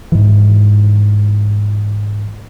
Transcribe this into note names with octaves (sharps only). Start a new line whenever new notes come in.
G#2 E3